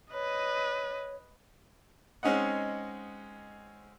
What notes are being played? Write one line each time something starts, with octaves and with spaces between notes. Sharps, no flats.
B4 C#5 D#5
G#3 C4 C#4 D#4 D#5 F#5